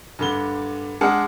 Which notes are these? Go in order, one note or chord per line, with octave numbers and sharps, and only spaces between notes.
G2 D3 G7
G#3 D4 F#5 A5 D#6 F6